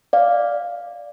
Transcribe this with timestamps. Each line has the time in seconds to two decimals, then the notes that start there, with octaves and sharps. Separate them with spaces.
0.13 D5 F5